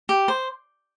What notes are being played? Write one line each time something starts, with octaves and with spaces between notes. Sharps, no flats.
G4
C5